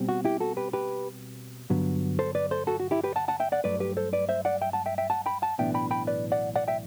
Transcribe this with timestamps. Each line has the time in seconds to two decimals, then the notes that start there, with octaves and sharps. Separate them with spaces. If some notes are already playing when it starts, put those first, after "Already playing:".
Already playing: B2 G3 C4
0.09 F#4
0.25 E4 G4
0.40 F#4 A4
0.57 G4 B4
0.73 G4 B4
1.70 G2 D3 F#3 B3
2.19 A4 C5
2.35 B4 D5
2.51 A4 C5
2.67 F#4 A4
2.80 F#4
2.91 E4 G4
3.04 G4 B4
3.16 F#5 A5
3.28 F#5 A5
3.40 E5 G5
3.52 D5 F#5
3.64 G2 F#3 A3 B4 D5
3.80 G4 B4
3.97 A4 C5
4.13 B4 D5
4.29 C5 E5
4.45 D5 F#5
4.61 E5 G5
4.73 F#5 A5
4.86 E5 G5
4.98 E5 G5
5.10 F#5 A5
5.26 G5 B5
5.42 F#5 A5
5.58 B1 A2 E3 B3 D4 E5 G5
5.74 G5 B5
5.91 G5 B5
6.07 B4 D5
6.32 D5 F#5
6.56 D5 F#5
6.68 E5 G5